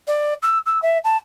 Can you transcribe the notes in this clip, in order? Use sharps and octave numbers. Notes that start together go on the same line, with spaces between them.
D5
E6
E6
E5
A5